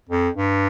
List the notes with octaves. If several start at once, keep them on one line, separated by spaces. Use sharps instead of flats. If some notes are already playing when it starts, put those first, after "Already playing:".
F2
G2